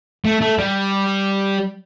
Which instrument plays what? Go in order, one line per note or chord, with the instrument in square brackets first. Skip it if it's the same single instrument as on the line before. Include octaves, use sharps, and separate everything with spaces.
[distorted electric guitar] A3
A3
G3